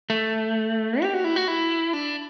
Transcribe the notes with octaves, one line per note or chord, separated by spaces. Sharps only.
A3
G4
F#4
E4
F#4
E4
D4